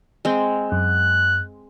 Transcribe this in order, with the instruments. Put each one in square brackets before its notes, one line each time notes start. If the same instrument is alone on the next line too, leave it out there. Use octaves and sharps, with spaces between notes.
[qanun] G#3 C4
[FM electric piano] F#2 [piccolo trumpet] F#6